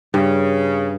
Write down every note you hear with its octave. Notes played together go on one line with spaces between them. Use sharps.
G2 C#3